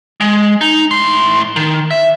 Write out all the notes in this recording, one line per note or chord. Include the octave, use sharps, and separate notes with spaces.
G#3
D#4
A2 C6
D#3
E5